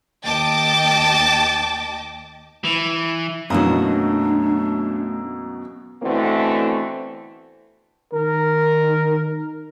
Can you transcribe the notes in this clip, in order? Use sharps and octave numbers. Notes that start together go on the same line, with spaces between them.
D#2 D#5 G5 A5 D6 A6
E3
F#2 B2 E3 F#3 A3 A#3 D4 D#5
B2 D3 E3 A3 C4
D#3 A#4